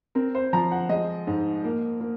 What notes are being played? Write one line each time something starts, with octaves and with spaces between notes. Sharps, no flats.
C4 A#4
C5
F3 A#5
F#5
G#3 D#5
G#2
A#3
A#3